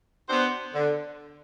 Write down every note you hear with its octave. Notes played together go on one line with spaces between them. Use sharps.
B3 D4 F#4 C5
D3